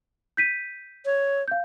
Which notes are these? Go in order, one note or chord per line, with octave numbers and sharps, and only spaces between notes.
G6 B6 D#7
C#5
F5 G6